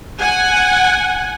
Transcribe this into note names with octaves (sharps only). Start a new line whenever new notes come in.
F#5 G#5